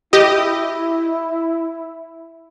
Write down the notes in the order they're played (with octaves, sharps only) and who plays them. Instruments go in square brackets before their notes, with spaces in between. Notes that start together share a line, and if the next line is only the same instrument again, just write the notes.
[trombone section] E4 [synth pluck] G4 D#5